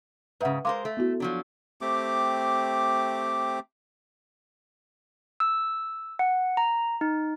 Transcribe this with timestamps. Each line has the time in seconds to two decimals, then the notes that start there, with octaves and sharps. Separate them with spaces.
0.41 G#2 C#3 B4 E5 F#5
0.65 G#3 A#4 C5 F5 C6 D6
0.85 A3
0.97 B3 E4 F#4
1.20 F3 F#3 D4
1.81 A3 C4 G4 D6
5.40 E6
6.19 F#5
6.57 A#5
7.01 D#4